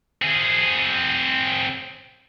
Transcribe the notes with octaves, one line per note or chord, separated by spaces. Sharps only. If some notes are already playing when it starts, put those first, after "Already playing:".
C4 G#4